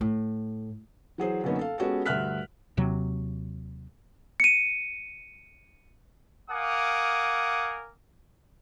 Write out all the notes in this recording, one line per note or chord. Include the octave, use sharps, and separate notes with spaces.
A2
E3 F#3 G#4 C5
F#2 D3 A#3 B3 C#4 D#4
A4 F5
G#3 B3 C#4 F#4 G4 A4
D2 G2 E5 F6 F#6 B6
D#2 C3 F#3
C#7 D#7
A#4 F5 F#5 G#5 D6 D#6